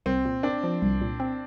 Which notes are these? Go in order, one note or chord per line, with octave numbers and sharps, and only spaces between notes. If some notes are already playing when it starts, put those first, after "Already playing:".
C2 C4
A#2
C4 D4
F3
C2
A#2
C4